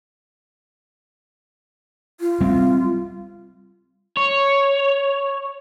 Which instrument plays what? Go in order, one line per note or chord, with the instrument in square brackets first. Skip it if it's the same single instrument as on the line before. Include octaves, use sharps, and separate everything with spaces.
[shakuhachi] F4
[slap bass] G3 C4
[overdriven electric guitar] C#5